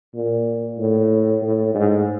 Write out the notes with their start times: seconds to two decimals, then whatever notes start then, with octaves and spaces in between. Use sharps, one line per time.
0.14 A#2
0.78 A2
1.42 A2
1.75 G#2